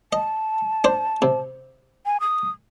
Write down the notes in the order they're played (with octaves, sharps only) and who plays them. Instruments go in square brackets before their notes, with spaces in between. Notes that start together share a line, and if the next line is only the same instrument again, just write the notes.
[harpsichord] D#5 [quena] A5
[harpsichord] D4 C5
C3
[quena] G#5
D#6